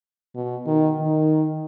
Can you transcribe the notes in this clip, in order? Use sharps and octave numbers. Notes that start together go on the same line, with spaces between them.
B2
D#3
D#3